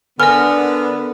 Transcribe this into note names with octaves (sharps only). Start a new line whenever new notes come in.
D3 B3 A#4 G#5 F6